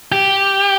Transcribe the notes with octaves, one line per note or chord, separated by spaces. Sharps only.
G4